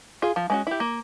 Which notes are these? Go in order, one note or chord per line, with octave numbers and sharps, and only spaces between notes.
F4 G#4
F3
G#3 C#4 F#4
E4 G4
A#3